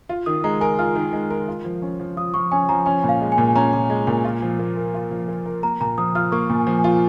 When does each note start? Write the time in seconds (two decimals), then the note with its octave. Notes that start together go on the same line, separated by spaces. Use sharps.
0.09 F4
0.26 D#3 D#6
0.44 G#3 A#5
0.61 A#4 G#5
0.79 F4 F6
0.96 D#3
1.13 G#3
1.30 A#4
1.48 F4
1.65 F3
1.82 C#4
2.00 F3
2.17 F4 D#6
2.34 F3 C#6
2.52 C#4 G#5
2.69 F3 A#5
2.86 C#4 G#5
3.04 A#2
3.09 F5
3.21 G#3
3.32 G#5
3.38 A#2
3.55 C#4 A#5
3.73 A#2
3.90 G#3
4.07 A#2
4.25 F4
4.42 F3
4.59 A#3
4.77 A#4
4.94 F4
5.11 F3
5.28 A#3
5.46 A#4
5.63 A#3 A#5
5.80 A#2 A#5
5.98 F3 D#6
6.15 F4 F6
6.32 A#3 C#6
6.50 A#2
6.55 G#5
6.67 F3
6.79 G#5
6.84 F4